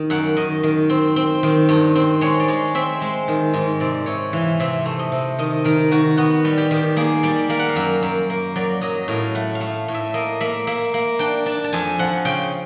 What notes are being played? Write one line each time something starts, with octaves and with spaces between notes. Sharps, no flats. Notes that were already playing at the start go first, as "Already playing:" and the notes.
Already playing: D#3
F#2 F#5
D#3 D#5
D#3
C4
C4
D#3
G2
C4
G#3 C#5
D5
G#3 C#5
C4 E5
G#3
D#3
G#2
C3 D5
C3 C#5
E3 F5
C3 E5
A3
D#5
C3
D#3 D#5
D#3 A#4
D#3 F#4
B3 F#4
G3
G4
D#3
A#3 G#4
G3 D5
A#3 F5
F#5
F5
F#2
F#2
A#3
F#3 D5
F#3 D#5
A2 F5
A3 F#5
F5
A3
A2
E5
A#3 D#5
A#3 E5
A#3 E5
A#3
D4 G5
D4 A5
A5
F2 G#5
F3 F#5
C#3 G5